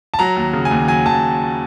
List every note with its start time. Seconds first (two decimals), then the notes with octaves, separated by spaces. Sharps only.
0.14 A5
0.19 F#3 A#5
0.36 D#2
0.53 C#3
0.65 G#5
0.71 D#2
0.88 F#3 G#5
1.05 D#2 A5